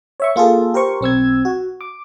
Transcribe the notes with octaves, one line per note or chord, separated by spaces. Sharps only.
C#5 E5 C#6
A#3 F4 G#4 A4
G4 A#4 C5 C#6
B1 C4 E6 G#6
F#4
D6